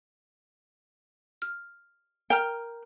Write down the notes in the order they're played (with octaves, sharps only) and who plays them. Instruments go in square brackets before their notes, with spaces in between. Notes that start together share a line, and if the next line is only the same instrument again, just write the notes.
[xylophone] F6
[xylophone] A#4 A#5 F6 [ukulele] G5